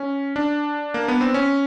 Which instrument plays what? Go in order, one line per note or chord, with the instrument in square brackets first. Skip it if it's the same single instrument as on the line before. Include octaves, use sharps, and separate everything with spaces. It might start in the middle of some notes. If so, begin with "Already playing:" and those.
Already playing: [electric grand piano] C#4
D4
A#3
B3
C4
C#4